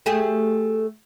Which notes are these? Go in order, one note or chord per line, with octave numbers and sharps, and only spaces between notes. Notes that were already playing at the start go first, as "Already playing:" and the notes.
A3 G4 G#4